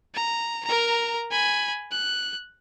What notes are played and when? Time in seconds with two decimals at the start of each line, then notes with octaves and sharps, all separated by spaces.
0.15 A#5
0.65 A#4 A#5
1.31 G#5 B5
1.92 F#6